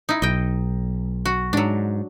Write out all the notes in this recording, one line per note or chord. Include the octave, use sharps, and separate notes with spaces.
D#4 E4
B1 D#5 G5
F#4
G#2 F#3 D4